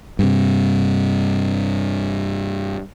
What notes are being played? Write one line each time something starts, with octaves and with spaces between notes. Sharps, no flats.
G2 C3